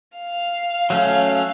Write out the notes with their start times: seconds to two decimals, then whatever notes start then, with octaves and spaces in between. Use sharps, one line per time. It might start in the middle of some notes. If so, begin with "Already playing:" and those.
0.18 F5
0.90 F#3 A3 C#4